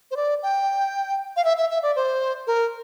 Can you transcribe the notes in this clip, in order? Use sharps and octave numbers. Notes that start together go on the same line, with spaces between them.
C5
D5
G5
F5
E5
E5
E5
D5
C5
A#4